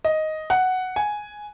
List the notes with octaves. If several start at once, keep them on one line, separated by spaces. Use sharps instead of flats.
D#5
F#5
G#5